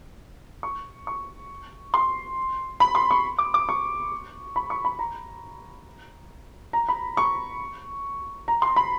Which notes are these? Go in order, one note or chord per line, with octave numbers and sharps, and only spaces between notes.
C#6
C#6
C6
B5
C6
C#6
D6
D6
C#6
B5
C#6
B5
A#5
A#5
B5
C#6
A#5
C6
B5